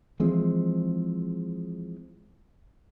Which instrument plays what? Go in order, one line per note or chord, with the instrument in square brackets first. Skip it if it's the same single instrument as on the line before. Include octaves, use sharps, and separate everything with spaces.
[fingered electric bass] E3 F3 G#3 C4